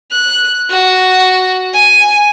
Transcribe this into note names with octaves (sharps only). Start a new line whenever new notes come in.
F#6
F#4
G#5